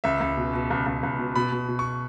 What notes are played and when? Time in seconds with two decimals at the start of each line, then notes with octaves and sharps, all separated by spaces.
0.04 C#2 E5
0.20 C#2
0.37 B2
0.53 B2
0.70 C#2
0.86 C#2
1.03 C#2
1.19 B2
1.35 B2 B5
1.52 B2
1.68 B2
1.79 C#6